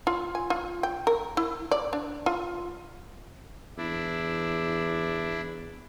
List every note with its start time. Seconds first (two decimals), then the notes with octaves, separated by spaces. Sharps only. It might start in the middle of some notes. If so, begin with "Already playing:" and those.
0.07 F4
0.35 G#5
0.50 F4
0.83 G5
1.07 A#4
1.37 E4
1.71 D5
1.93 D4
2.26 F4
3.78 E2 D4 E4